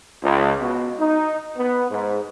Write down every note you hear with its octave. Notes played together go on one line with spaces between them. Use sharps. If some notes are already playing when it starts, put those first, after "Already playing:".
C#2
B2
D#4
B3
G#2